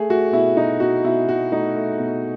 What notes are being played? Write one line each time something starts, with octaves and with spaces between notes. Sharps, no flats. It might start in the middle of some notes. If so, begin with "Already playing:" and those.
Already playing: A3 G#4
A3 F#4
B2 E4
B2 D#4
B2 F#4
B2 E4
B2 F#4
A3 D#4
A3
B2